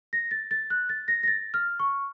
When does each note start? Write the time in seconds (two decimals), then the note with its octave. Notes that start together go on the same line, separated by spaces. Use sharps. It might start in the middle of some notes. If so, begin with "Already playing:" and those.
0.13 A#6
0.31 A6
0.51 A6
0.70 F#6
0.89 A6
1.08 A#6
1.23 A#6
1.28 A6
1.54 F6
1.80 C#6